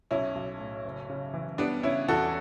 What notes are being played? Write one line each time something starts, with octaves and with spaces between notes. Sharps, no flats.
B1 C#4 E4
B1
A2
F#1
C#3
E3
G3 B3 D4
C#3 C#4 E4
E2 F#4 A4